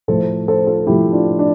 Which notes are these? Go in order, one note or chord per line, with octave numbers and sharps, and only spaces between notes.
A2 F3 A3 A4 C5
A4 C5
F4 A4
A2 F3 A3 E4 G4
D4 F4
D4